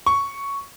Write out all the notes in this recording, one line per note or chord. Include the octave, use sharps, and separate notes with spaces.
C#6